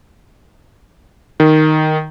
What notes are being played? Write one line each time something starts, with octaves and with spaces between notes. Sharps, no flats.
D#3